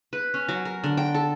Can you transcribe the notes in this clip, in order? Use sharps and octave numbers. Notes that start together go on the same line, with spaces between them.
B4
C#4
F#3
A#4
D3
G5
A4